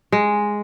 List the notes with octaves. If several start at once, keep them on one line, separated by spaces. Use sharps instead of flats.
G#3